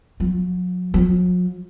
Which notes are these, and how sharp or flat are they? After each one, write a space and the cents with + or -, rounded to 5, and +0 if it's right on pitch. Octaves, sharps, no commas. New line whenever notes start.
F#3 -35
F#3 -45